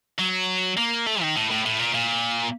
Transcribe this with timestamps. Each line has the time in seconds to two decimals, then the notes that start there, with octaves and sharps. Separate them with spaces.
0.18 F#3
0.77 A#3
1.06 A3
1.21 D#3
1.36 A2
1.50 A2
1.65 A2
1.79 A#2
1.94 A#2